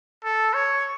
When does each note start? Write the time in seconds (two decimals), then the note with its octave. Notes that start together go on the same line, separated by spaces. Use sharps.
0.24 A4
0.54 C#5